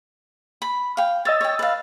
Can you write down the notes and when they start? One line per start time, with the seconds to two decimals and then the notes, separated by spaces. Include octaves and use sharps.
0.62 B5
0.97 F5 G5
1.25 C#5 D#5 E6 A6
1.41 C#5 G5
1.59 B4 F5